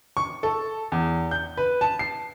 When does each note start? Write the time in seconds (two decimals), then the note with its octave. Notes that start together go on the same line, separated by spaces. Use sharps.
0.17 C#6
0.43 A4
0.92 E2
1.31 G6
1.57 B4
1.81 A5
1.99 C7